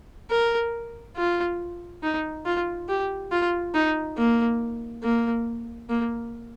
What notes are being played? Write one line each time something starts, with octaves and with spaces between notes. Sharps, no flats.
A#4
F4
D#4
F4
G4
F4
D#4
A#3
A#3
A#3